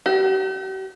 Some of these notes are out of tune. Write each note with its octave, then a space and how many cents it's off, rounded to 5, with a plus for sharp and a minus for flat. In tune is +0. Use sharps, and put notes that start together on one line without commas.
G4 -45